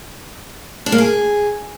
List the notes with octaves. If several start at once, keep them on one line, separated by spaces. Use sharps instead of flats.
D4
A#3
G#4